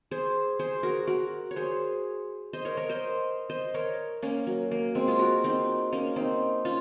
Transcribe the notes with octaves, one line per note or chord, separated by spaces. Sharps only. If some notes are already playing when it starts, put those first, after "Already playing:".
G#4 C5
G#4 C5
F#4 A#4
F#4 A#4
C#5
G#4 C5
C5 D#5
A#4 C#5
A#4 C#5
C5 D#5
C5 D#5
A#4 C#5
A#3 C#4
F#3
A#3
G#3 C4
F4 G#4
F#4 A#4
C4 D#4
A#3 C#4
C4 D#4
C#4 F4